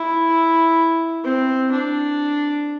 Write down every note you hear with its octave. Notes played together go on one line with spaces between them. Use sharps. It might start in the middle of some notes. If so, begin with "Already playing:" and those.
Already playing: E4
C4
D4